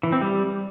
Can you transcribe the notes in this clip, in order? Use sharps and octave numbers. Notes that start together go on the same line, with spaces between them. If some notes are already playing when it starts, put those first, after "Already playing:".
E3
C4
G3